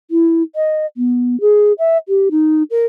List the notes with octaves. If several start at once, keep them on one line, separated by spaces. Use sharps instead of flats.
E4
D#5
B3
G#4
E5
G4
D#4
A#4